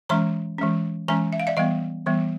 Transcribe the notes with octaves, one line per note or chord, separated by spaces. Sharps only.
E3 G#3 C#4 A#5 C6
E3 G#3 C#4
E3 G#3 C#4 G#5 A#5
E5
F5
D5 E5
E3 G3 B3 D#5 F5
E3 G3 B3